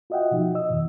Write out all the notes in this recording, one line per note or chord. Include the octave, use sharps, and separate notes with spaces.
F4 F#4 D#5 E5 F#5 G5
B2 F3 D#4 F#4
D#5 E6
F2 B2 D#3 E3